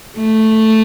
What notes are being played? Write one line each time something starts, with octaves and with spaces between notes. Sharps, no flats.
A3